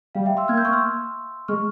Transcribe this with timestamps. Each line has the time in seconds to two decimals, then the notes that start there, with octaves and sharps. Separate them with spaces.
0.15 G3 F5
0.26 E5 G5
0.37 C6 E6
0.48 A#3 F6 G#6
0.57 E6 G6
0.65 C#6 F6
0.73 C6 E6
1.48 G#3 C#6 F6